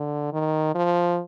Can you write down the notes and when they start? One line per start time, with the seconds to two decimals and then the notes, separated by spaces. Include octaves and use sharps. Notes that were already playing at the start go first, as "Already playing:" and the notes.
Already playing: D3
0.33 D#3
0.75 F3